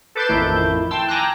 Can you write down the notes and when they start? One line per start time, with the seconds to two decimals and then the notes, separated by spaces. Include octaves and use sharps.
0.15 A4 B4 D6 G6 C7 E7
0.28 A1 F2 D#3 A3 E4 G6
0.90 G5 A5 C6 E6
1.08 G5 G#5 A#5 D6 E6 F#6